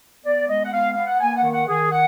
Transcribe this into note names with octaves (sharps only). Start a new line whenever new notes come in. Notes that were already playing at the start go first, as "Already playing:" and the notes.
B3 D5
G#3 D#5
F#5
B3 F5
B3 F5
F#5
A#3 G#5
F#5
D#3
F#5
D#3 G#4
F#5